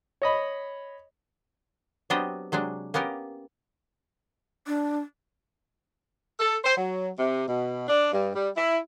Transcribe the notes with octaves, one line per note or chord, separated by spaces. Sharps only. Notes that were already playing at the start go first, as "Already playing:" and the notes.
C#5 D#5 B5
F#3 B3 C4 D4 G4 D#5
C3 F#3 G#3 D4
A#3 B3 C#4 G4 A#4
D4
A4
C5
F#3
C3
B2
D4
G2
G3
E4